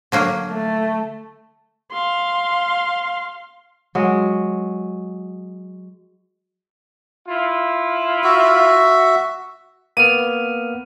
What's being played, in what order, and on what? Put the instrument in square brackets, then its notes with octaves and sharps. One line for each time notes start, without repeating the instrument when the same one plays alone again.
[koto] D3 F#3 A#3
[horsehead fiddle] A3
[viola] F5 C6
[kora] F#3 G#3
[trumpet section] E4 F4
[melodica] F#4 E5
[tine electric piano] A#3 B3 F6 [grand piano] D#7